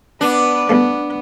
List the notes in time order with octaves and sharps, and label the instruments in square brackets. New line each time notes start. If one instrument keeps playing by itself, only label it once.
[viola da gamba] B3 B4 [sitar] D4
[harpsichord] E2 G2 A3 [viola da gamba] B3